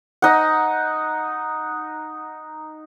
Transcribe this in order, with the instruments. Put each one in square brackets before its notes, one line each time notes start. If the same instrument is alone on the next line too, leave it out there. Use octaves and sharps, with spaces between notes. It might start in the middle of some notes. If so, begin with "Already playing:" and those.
[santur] D#4 F#5